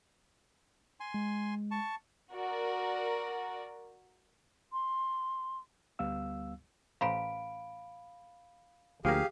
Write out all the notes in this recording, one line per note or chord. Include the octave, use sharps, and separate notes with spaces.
G#5 C6
G#3
A5 C#6
F#4 A#4 D5
C6
D2 G3 B3 F5 E6
A1 C5 F5 A#5 B5 D7
D2 F3 A#3 G4 G#4 F5